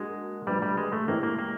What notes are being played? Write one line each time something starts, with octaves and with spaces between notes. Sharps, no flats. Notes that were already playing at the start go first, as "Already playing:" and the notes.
Already playing: G#3 A#3 D4 F#4
F3 G3 A3 D4 G4 B4
G3
G#3
A3
E3 G#3 A#3 C#4 E4 G4
A#3
A#3